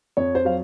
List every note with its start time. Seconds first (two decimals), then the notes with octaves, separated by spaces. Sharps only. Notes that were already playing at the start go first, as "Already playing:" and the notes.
0.17 F2 C#5
0.35 C5
0.45 F#3 F5